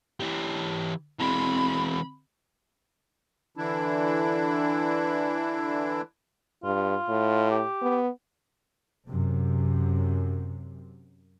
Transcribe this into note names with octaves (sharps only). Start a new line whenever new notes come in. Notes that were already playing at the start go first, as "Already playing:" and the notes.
E3 G4
E3 G#3 C4 B5
D3 E3 D4 E4
G2 F4
A2
G4
B3
F#2 C3